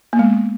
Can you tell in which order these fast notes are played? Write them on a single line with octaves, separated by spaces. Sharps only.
A#3 B3 G#3